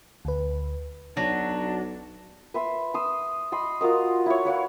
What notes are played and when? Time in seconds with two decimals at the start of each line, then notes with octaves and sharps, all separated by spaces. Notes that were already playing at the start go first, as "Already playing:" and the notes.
0.25 D2 B4
1.17 B1 F#3 D4
2.54 B4 E5 C6
2.94 C6 D#6 E6
3.52 D#5 B5 C6
3.81 F4 F#4 A#4 D#5
4.26 E4 C#5
4.45 B4 C#5 F5 F#5